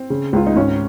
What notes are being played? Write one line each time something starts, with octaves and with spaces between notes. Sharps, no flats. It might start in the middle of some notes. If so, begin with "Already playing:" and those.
Already playing: C4
C#3
C#2 F4
D#4
G#1 C#4